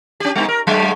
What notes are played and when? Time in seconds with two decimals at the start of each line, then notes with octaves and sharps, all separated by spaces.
0.20 C#4 G4
0.35 G3 B3 D#4
0.49 A#4
0.67 G2 F#3 G#3